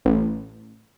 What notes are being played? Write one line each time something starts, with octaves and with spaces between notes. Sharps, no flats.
A1